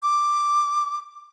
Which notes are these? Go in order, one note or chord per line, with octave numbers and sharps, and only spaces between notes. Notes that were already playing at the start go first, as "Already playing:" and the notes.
D6